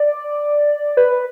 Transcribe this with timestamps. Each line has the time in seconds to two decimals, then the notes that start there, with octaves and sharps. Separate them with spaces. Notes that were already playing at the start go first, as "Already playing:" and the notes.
Already playing: D5
0.97 B4